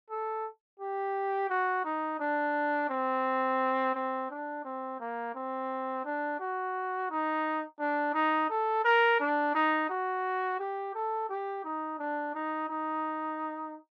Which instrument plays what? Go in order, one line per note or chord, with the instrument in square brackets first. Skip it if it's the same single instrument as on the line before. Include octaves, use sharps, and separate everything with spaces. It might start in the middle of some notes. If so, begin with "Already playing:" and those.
[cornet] A4
G4
F#4
D#4
D4
C4
C4
D4
C4
A#3
C4
D4
F#4
D#4
D4
D#4
A4
A#4
D4
D#4
F#4
G4
A4
G4
D#4
D4
D#4
D#4